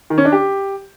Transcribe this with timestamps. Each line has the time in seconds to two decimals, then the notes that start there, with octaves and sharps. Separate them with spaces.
0.10 D#3
0.18 C#4
0.25 D4
0.32 G4